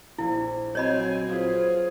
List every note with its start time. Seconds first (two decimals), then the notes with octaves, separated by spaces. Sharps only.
0.18 A#1 E4 G#4
0.75 F#3 C4 C#5 D#5 G#5 B5 G6
1.29 F4 G#4 B4 C5